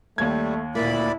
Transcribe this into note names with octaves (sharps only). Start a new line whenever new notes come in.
D#2 G3 A3 G#6
D2 A#2 A#3 E4 D5 B5